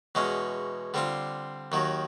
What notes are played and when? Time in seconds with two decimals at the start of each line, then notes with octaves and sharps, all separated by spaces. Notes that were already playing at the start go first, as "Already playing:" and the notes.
0.15 E2 B2 G#3 C#4
0.94 D3 G3 C4 F4
1.72 D#2 D#3 F#3